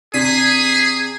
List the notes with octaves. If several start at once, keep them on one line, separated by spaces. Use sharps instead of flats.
C3 D4 G#4 B6 C7 D#7